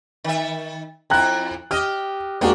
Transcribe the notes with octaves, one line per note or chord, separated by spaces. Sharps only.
D#3 E5
F2 E4 G5 A#5 F#6
G4 D#5 F6
G#3 A#3 D4 D#4 F#4 G4